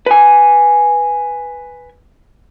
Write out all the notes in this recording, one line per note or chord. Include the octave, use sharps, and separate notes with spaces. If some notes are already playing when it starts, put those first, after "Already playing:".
B4 G#5